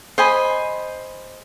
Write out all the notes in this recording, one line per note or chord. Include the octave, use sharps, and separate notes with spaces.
C5 D#5 G#5 B5